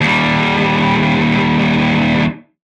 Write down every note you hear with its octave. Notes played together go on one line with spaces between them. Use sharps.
D#2 G3